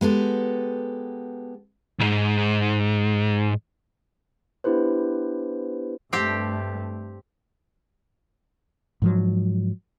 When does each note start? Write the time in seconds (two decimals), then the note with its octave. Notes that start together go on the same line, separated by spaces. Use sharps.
0.01 G#3 B3 G4 A4
1.99 C2 G#2
4.64 B3 D4 E4 G4 B4 C5
6.13 G2 A3 C4 G4
9.02 G#2 F3 F#3